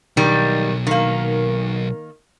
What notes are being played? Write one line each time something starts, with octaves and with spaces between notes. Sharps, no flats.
B1 D#3 G3
D#3 A#3